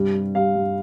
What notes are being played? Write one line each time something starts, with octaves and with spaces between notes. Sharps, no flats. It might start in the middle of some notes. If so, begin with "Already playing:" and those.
Already playing: G2 C3 G3
G3
G3 F5
G2